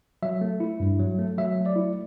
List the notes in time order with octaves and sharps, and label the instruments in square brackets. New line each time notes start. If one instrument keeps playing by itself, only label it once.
[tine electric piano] F#3 E5
A3
E4
G2
F#3
A3
F#3 E5
A3
D5
E4